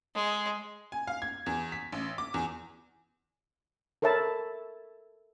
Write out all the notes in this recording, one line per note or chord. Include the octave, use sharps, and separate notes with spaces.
G#3
G#5
F5
G#6
E2
B6
A1
D6
E2
A4 A#4 C#5 E5 A5 B5